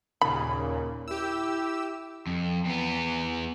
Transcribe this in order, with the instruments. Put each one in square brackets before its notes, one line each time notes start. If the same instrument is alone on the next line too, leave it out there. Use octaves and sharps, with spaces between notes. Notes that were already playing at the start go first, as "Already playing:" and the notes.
[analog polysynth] D#2 A#2 C#3 [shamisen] B5
[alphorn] A#3
[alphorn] E4 [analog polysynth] G4 E6
[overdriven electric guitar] F2
E2 B3